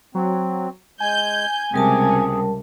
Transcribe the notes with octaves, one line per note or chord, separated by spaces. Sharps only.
F#3 C4
G#3 G#5 G6
C#2 C3 G3 G#4 A#4 A5